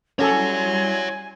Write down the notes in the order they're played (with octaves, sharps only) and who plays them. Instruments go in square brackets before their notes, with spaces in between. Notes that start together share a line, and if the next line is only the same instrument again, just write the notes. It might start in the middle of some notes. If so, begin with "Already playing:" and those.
[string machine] G3 E4 C6 [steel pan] C#4 A4 [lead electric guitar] C#5 F#5 [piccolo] G#5